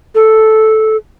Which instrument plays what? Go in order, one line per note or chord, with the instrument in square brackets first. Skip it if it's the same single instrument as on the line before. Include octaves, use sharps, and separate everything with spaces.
[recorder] A4